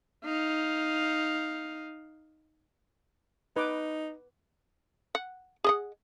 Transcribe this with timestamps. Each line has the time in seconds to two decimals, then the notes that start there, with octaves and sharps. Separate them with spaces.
0.25 D#4 F5
3.56 D#4 B4 D6
5.15 F#5
5.64 G#4 D#5 F#5